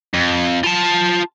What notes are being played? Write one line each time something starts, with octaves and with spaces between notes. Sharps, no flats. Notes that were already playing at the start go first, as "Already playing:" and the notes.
F2
F4 A5